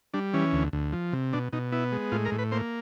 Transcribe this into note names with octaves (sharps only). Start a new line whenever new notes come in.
G3 D4
E3 C#4
D2
D2
F3
C3
B2 D4
B2 D#4
B3 E4
G#3
A2 F4
A#4
A2
B4
A#3 C5